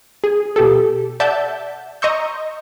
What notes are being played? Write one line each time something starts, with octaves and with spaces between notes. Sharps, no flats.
G#4
B2 G4 A4
D5 E5 F#5 A5 G6
D#5 A#5 C6 C#6 E6 G6